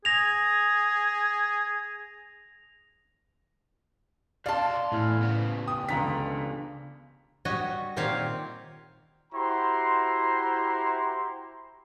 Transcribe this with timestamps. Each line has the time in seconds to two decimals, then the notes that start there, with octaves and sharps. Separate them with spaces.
0.05 G#4 A#6 F7
4.46 B2 D5 F5 A5 C6
4.92 E2 A2 E4 F6
5.22 C#3 B3
5.68 G5 D#6
5.89 C#2 D3 A#5 B6
7.45 G3 F#4 C#5 D#5
7.97 A#2 D#3 C4 G4 C#5 F5
9.33 E4 F#4 G4 C5 A#5 C6